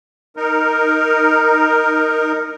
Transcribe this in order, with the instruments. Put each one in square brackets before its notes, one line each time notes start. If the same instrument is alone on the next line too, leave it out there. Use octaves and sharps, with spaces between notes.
[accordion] D#4 A#4